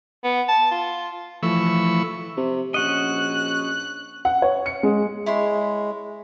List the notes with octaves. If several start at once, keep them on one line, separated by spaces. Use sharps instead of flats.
B3
A5
F4
E3 F3 A3 B5 C#6 E6
C3
A#1 C#4 F#4 D#5 F#6
F#5
C#5
C#7
G#3
G#3 E4 C#5 C6